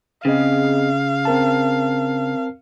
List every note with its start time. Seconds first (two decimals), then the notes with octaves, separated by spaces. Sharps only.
0.25 C#3 C4 G#4 D#5 F5
1.25 C4 A#4 A5